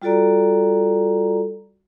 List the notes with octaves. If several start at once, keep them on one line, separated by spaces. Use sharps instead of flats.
G3 F4 F#4 A4 D5 A#5